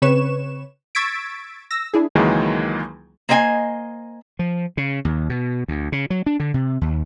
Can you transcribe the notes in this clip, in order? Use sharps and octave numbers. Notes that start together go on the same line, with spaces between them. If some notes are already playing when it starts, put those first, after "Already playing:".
C#3 C4 B4 C#5 C#6 E7
C#6 E6 G#6 A6 B6 D7
E6 A#6
D4 E4 G#4
C#2 D#3 E3 F#3 G#3 A#3
A#3 C5 D#5 G5 G#5
F3
C#3
D#2
B2
D2
C#3
F#3
D4
D3
C3
D#2